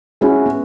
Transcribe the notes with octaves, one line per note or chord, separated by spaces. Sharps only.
G#3 C#4 E4 F#4
B3